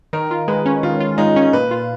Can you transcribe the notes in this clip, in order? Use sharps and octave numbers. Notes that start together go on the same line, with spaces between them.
D#3 A#4
F4
G#3 B4
C#4
D#3 F4
F4
G#3 D#4
C#4
A#2 B4
F4